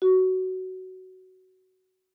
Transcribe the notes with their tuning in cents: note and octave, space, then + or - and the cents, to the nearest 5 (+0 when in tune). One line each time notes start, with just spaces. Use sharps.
F#4 +15